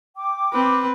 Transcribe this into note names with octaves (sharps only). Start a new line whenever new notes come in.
G5 D6
C4 B4